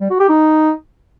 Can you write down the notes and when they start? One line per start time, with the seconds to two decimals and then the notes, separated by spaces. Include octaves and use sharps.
0.01 G3
0.10 F#4
0.20 G4
0.29 D#4